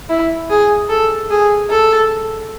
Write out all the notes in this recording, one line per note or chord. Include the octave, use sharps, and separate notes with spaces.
E4
G#4
A4
G#4
A4